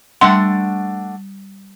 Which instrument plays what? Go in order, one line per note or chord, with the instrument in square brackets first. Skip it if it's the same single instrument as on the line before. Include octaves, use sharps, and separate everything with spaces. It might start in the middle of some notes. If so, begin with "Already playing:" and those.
[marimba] G3 [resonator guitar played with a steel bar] A3 D4 F#5 [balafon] C6